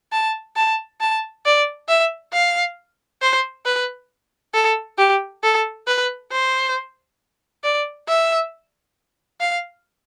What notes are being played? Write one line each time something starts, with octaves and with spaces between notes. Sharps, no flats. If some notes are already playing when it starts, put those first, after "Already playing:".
A5
A5
A5
D5
E5
F5
C5
B4
A4
G4
A4
B4
C5
D5
E5
F5